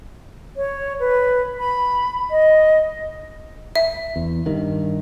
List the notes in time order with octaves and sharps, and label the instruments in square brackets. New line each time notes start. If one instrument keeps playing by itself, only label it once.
[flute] C#5
B4
B5
D#5
[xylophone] E5
[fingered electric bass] E2
G2 D#3